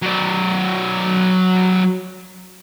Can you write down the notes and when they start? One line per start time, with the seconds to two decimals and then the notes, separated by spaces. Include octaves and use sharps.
0.02 F#3 D5